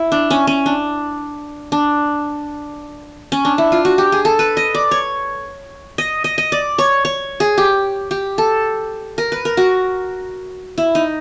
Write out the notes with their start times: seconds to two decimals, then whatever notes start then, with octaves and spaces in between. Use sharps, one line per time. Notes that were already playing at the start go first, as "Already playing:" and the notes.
Already playing: E4
0.12 D4
0.30 C#4
0.47 C#4
0.66 D4
1.72 D4
3.32 C#4
3.45 D4
3.58 E4
3.72 F4
3.85 F#4
3.98 G4
4.12 G#4
4.25 A4
4.39 B4
4.57 D#5
4.75 D5
4.91 C#5
5.98 D#5
6.24 D#5
6.38 D#5
6.52 D5
6.78 C#5
7.05 C#5
7.40 G#4
7.58 G4
8.11 G4
8.38 A4
9.18 A#4
9.32 B4
9.45 A#4
9.57 F#4
10.78 E4
10.95 D#4